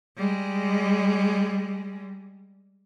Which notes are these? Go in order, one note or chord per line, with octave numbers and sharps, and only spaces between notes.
G3 G#3